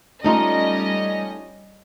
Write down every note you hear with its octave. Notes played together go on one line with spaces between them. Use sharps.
G3 A3 C#4 D#4 F4 D#5